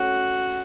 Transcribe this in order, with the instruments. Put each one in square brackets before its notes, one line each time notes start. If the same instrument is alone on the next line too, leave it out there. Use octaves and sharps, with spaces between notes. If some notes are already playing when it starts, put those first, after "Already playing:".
Already playing: [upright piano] A3 C#4 [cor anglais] F#4